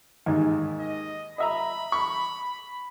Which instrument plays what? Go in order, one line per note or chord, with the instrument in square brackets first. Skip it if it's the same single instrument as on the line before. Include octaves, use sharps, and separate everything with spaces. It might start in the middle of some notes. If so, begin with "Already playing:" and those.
[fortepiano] D#2 G#2
[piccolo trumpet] D#5
[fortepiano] D#5 E5 A#5 [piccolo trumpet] B5
[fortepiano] C#6